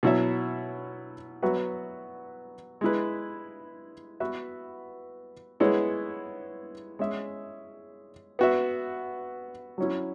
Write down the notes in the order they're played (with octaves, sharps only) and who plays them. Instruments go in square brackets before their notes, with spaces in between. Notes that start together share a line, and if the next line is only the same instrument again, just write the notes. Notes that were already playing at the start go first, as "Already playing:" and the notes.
[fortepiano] B2 F#3 E4 C#5 E5
F#3 B3 F#4 B4 E5
G#3 E4 B4
B3 F#4 B4 E5
G#3 B3 E4 C#5
G#3 C#4 G#4 E5
B3 F#4 E5
F#3 C#4 E4